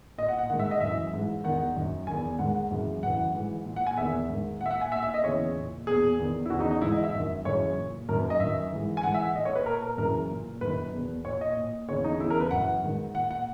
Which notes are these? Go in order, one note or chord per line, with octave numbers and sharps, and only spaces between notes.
A#2 D#5
F#5
F#5
G#2 D#3 F#5
E5
D#5
F#2 E3 E5
G#2 E3
E2 D#3 F#5
F#2 D#3
D#3 G#5
E2
G#2 D#3 F#5
F#2 C#3 E3
F#2 E3 F#5
G#2 E3
A#2
F#5
G#5
E2 D#3 E5
G#2 D#3
A#2 F#5
E5
F#5
G#5
A#2 E5
E5
D#5
E2 C#3 E3 C#5
A#2
E2 B2 G#4
E2 D#3
E4
E2 C#3 E3 F#4
D#4
D#4
G#2 E3 E4
D#5
E5
F#2 D#3
F#2 C#3 E3 C#5
A#2
F#2 D#3 A#4
B4
D#5
F#2 D#3 E5
G#2 E3
G#5
G#2 E3 F#5
E5
F#5
A#2 D#5
C#5
B4
A#2 A#4
A#4
F#2 C#3 E3 A#4
A#2
F#2 D#3 B4
E2 B2
A#2 C#5
D#5
A#2
E2 C#3 E3 C#5
D#4
E2 C#3 E3 E4
A#4
B4
F#2 E3 F#5
G#2 D#3
A#2 F#5
F#5